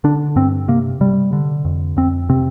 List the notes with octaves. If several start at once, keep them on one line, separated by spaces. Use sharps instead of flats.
D3 D4
G2 C4
C3 A#3
C3 G3
D3
F2
F2 C4
C3 C4